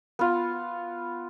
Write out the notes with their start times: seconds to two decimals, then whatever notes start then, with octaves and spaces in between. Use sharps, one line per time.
0.19 B3 F4